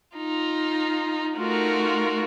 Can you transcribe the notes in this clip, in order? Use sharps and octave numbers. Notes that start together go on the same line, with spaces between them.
D#4 F4
A3 D#4 F4 F#4 A#4